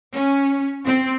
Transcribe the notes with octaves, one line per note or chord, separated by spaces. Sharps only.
C#4
C4